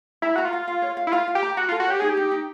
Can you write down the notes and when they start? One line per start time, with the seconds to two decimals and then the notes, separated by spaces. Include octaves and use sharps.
0.22 E4 A#5
0.36 F#4 A#5
0.45 F4
0.53 F5
0.68 F5
0.82 C#5
0.97 F5
1.07 E4
1.12 F4 F5
1.28 F5
1.35 G4
1.43 A#5
1.57 F#4 A#5
1.68 F4
1.72 A4
1.80 F#4
1.87 G4 C#5
2.00 D#4 G#4
2.09 G4
2.17 D#4
2.32 D#4